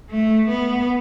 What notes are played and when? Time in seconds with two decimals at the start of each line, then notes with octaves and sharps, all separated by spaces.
0.10 A3
0.49 B3